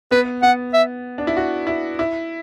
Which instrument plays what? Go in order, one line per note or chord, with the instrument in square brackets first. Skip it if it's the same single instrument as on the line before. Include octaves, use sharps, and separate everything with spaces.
[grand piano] B3 [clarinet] B4
[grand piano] B3 [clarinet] F#5
[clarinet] E5
[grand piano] D4
E4
F#4
E4
E4